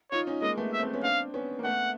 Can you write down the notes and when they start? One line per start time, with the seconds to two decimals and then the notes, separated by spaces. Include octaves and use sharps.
0.12 D#4 F4 C#5
0.27 C#4 D#4
0.42 G#3 A#3 D#5
0.57 A3 B3
0.73 E5
0.79 C4
0.83 A3 B3
0.93 B3 C#4
1.03 C4 D4 F5
1.34 B3 C#4
1.59 A#3
1.64 A3 B3 F#5